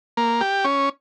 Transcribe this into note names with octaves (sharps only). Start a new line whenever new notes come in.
A#3
G4
C#4